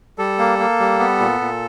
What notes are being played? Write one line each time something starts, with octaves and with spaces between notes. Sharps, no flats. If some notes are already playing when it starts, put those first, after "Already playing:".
G3 A4
A#3
A#3
G3
B3
A#2
A#2